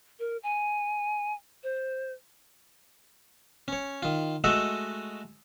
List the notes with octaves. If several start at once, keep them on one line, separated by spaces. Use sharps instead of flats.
A#4
G#5
C5
C#4 C#5
D#3 F4
G#3 A3 F#4 A4 D#5 E5